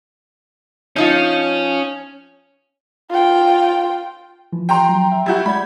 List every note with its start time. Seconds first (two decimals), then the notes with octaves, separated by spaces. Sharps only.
0.96 F3 C#4 D#4 F4
3.10 F4 G5
4.52 E3 F3
4.69 G5 A#5 C6
4.89 F#3
5.12 E5
5.26 G3 E4 F#4 F#5 G6 G#6
5.46 G#3 D5 B5 G#6